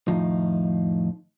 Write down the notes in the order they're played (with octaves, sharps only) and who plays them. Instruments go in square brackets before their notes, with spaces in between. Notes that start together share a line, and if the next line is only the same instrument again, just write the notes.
[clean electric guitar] F2 A2 D#3 F3 D#4 F4